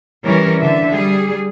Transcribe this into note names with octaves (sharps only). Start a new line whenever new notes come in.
E3 G3 C#4 A#4 C#5
D3 E5
G3 G#4